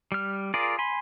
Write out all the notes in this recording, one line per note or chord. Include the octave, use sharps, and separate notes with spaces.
G3 F6
F4 G#4 A#4 D5
G#5 B5 C6